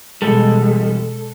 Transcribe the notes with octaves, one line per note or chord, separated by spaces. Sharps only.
E2 B2 G3 G#3 A4